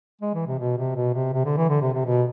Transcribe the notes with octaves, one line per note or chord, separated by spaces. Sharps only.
G#3
E3
C3
B2
C3
B2
C3
C3
D3
E3
D3
C3
C3
B2